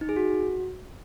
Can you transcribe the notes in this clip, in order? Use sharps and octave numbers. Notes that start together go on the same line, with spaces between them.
D#4
G#4
F#4